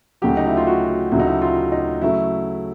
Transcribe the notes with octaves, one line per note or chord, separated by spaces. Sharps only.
D2 C#3 F#3 G4
D#4
E4
F4
F#4
D2 C#3 F#3 E4
D#4
E4
F4
D#4
C#3 F#3 A3 E4